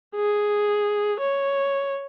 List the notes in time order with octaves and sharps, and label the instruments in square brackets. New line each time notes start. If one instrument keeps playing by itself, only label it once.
[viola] G#4
C#5